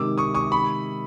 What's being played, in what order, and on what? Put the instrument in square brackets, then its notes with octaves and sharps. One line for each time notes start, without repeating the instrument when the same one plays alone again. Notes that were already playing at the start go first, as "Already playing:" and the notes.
Already playing: [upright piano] C3 D#3 G#3 [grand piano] D6 E6
[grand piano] C#6 D#6
C#6 D#6
B5 C#6